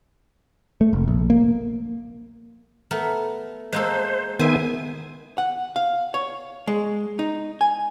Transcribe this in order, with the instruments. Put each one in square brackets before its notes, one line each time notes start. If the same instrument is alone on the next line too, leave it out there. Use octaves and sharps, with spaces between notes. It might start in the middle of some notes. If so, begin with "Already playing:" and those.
[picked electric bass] A3
F1
A#1
A#3
[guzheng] A3 B3 A#4
[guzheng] G#3 A#3 A4 [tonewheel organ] C5
[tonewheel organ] D#3 B3 G#5 [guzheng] C5 E5
[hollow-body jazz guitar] F#5
F5
C#5
G#3
D#4
G#5